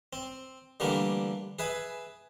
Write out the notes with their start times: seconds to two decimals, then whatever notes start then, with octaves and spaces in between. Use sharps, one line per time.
0.13 C4
0.80 D3 E3 G3 A3 A#3 D4
1.59 G#4 B4 E5 G#5